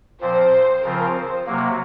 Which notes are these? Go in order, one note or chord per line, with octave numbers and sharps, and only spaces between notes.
A#2 F3 C4 C5
C#3 F3 C4 F4 A#4
C5
C3 F#3 A#3 F#4